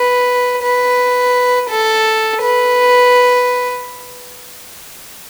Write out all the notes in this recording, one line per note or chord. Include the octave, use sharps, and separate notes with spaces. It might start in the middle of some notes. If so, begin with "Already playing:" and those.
Already playing: B4
B4
A4
B4